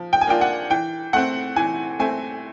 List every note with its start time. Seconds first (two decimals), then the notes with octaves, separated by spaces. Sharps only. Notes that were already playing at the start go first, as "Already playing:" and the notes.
Already playing: F3
0.13 G5
0.21 G#5
0.27 A#3 D4 F4 G5
0.41 F#5
0.70 E3 G5
1.13 A3 C4 F#5
1.56 E3 G#5
1.99 A3 C4 G#5